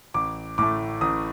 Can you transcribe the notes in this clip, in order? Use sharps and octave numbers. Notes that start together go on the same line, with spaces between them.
A1 D6
A2 A3 D6
A1 D#6